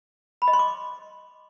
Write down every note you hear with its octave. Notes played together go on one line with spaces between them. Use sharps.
B5
D#5
C6
D6